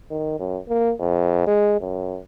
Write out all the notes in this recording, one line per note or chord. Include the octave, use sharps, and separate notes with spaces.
D#3
F#2
A#3
F2
G#3
F#2